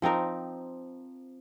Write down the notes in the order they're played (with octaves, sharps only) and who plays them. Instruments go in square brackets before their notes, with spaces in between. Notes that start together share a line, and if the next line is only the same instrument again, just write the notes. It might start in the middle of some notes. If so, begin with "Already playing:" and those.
[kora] F3 C4 D#4 A#4